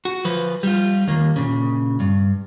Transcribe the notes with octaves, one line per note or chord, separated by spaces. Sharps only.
F#4
F3 B4
G3 F4
D#2 A#3
A#2 C#3
G2